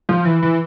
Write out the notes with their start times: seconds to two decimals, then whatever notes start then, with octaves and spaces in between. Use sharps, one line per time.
0.09 F3
0.25 E3
0.42 E3